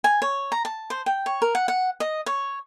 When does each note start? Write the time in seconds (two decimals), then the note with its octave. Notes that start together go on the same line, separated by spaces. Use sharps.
0.04 G#5
0.22 C#5
0.52 A#5
0.65 A5
0.90 C5
1.06 G5
1.26 C#5
1.42 A#4
1.55 F#5
1.68 F#5
2.00 D#5
2.26 C#5